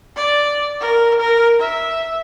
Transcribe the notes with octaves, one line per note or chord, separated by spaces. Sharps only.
D5
A#4
A#4
E5